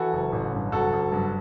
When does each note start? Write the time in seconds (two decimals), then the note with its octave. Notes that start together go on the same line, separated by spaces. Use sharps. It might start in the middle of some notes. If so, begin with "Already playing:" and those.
Already playing: E3 F#4 A4
0.13 F#1
0.32 A1
0.53 G2
0.72 F#1 F#4 A4
0.92 F#1
1.12 G2